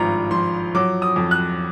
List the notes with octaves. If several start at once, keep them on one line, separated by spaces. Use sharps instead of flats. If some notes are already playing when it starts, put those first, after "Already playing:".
Already playing: G#1 G2 F3 A#5
F3 C6
F#3 D6
D#6
F2
F#6